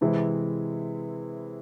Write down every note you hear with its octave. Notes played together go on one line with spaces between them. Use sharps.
C3 E3 G#3 C4 E4